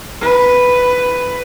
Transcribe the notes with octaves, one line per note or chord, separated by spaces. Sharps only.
B4